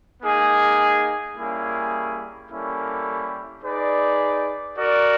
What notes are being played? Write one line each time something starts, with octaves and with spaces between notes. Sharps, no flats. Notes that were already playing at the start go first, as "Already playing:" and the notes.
A#3 D#4 G#4
G3 A#3 C#4 E4 G#4
G3 A#3 C#4 E4 A4
D#4 G#4 B4 D5
F#4 A#4 D5